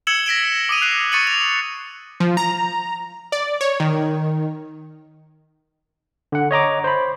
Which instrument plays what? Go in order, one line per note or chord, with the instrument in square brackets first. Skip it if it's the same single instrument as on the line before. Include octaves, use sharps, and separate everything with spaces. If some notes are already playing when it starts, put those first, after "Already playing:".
[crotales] E6 G#6 C#7 E7 F#7 G7
A#6 B6 D7 E7
D6 D#6 D#7 F7
F#6 C7 D#7
C#6 A6 C#7 D#7 F#7
F7
[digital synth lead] F3
A#5
D5
C#5
D#3
[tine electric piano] D3 F#5
C#5 D#5 A#5 D6
C5 B5